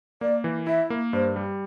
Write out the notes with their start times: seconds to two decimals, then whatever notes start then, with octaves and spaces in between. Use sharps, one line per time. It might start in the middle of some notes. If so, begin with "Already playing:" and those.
0.21 A#3 D5
0.44 E3
0.67 E4 E5
0.90 A#3
1.13 G2 C5
1.36 G3